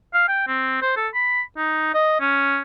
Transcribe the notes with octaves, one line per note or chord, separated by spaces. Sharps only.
F5
G5
C4
C5
A4
B5
D#4
D#5
C#4